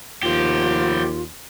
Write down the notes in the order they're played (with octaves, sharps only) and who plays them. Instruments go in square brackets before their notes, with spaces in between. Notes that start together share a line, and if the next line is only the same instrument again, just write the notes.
[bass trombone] D#2 [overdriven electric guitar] F3 G4 [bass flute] F4